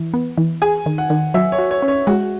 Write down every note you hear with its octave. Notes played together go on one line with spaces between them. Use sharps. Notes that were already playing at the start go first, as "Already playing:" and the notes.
Already playing: E3
B3
E3
G#4 G#5
D#3
F#5
D#3
F#3 E5
C#5
F#4
C#5
C#4
C#5
G#3 F#4